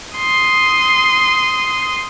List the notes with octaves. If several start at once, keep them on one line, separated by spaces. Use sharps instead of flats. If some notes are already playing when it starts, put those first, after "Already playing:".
C6 D#6